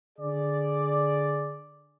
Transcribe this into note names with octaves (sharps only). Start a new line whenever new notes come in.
D3 G#4 D5